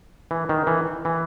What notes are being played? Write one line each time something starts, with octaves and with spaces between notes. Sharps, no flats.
E3
D#3
E3
E3